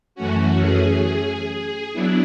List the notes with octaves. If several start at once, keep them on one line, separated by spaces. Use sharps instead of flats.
F#2 E3 A3 C#4 F#4
G#4
G#4
F#3 B3 D4 E4